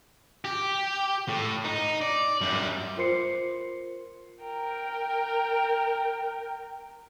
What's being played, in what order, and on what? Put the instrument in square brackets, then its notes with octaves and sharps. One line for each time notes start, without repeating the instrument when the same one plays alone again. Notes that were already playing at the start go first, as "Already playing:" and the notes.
[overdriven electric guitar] G4
A2
D#4
D5
F#2 G3
[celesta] F4 A#4 C5 C6 C7 C#7
[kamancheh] A#4 G5